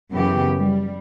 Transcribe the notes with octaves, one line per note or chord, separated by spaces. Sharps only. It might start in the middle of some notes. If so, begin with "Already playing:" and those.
F#2 C#3 E3 B3 G4
G3